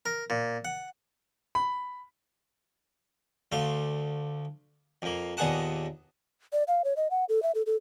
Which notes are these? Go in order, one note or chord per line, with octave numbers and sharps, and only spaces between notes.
A#4
A#2
F#5
B5
D2 A3 F5 C6
F2 A#3
D#2 A#2 B3 G#4 F#5 A5
D5
F5
C#5
D#5
F#5
A4
E5
A4
A4